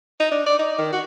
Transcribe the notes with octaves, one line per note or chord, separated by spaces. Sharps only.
D#4
D4
D5
D#4
D#3
F#4